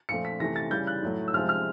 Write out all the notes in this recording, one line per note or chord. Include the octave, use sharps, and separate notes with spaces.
A#2 F3 A3 C#7
B6
C3 E3 A3 A#6
A6
C#3 E3 G3 G6
F#6
A2 F#3 A3
E6
C3 F3 G#3 F6
F6